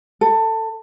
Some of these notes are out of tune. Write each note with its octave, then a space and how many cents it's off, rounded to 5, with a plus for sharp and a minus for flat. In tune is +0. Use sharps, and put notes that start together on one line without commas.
A4 +20